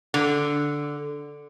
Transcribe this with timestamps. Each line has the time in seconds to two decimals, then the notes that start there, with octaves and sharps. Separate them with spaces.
0.14 D3